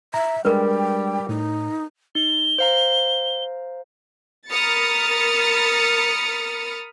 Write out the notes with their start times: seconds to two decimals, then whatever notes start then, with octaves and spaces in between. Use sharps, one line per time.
0.14 E5 A#5
0.45 G3 G#3 D4 A#4 B4 G5
1.29 A2 D#4
2.15 D#4 G7
2.59 C5 F5 A#5
4.49 A#4 B5 D#6 F6 A6 C#7